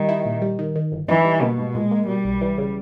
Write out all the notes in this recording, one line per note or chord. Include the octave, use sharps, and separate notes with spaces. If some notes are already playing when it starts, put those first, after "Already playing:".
Already playing: D#3 G3
E4
A#2
G3
D#3
D#3
G1
E3 D#4
G3
B2 A#3
G#2
A#2 G#3
A#3
B2 G3
B1
E3
C#3